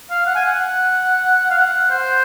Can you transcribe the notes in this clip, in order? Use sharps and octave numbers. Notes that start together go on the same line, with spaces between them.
F5
F#5
G#5
F#5
F5
F#5
C5